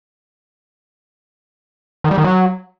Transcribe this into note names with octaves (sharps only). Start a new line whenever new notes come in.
D#3
G3
D#3
F#3